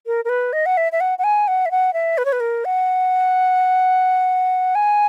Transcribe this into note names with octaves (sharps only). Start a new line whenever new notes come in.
A#4
A#4
B4
D#5
F#5
E5
E5
F#5
F#5
G#5
F#5
E5
F#5
E5
B4
C#5
B4
A#4
F#5
G#5